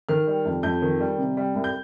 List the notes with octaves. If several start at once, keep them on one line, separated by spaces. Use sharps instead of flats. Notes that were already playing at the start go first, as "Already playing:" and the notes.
D#3 F6
G3
F2
F2 G6
D#3
G3
C3
G3
C2
G6